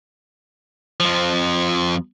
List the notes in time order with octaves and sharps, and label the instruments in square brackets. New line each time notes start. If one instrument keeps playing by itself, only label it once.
[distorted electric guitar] F2 F3